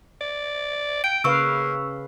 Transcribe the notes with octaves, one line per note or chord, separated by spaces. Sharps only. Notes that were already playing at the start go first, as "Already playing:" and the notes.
D5
G5 D7
C#3 A#3 B4 F5 C#6 E6